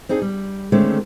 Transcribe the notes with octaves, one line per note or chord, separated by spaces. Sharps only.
C4 D4 D#4 G#4
G3
D3 D#3 G#3 A3 C4 C#4